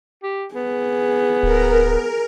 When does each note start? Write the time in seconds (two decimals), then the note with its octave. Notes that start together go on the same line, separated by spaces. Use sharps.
0.23 G4
0.55 B3 G#4
1.43 D1 A#4